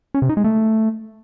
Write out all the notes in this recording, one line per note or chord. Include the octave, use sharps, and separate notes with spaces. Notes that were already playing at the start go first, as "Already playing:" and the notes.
C#4
C3
D#4
G#3
A3